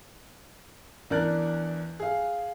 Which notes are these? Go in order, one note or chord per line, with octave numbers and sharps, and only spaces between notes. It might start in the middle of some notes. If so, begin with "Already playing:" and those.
E2 D4 A#4 F#6
G#4 F5